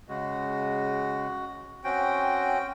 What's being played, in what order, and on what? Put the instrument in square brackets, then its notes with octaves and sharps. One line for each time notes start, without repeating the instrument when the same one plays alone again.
[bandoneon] C#3 G#3 [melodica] F#4
[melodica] C4 C#4 F#4 [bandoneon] G5